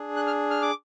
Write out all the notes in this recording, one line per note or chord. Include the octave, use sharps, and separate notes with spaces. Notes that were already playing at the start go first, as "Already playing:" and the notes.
Already playing: D4 G#4
F#6
F6
F6
D6